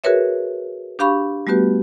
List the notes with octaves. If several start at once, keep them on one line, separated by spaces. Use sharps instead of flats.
F#4 G#4 A#4 B4 C#5 E5
D4 G4 F5 B5 C#6
G3 A3 B3 F#4 G4 B4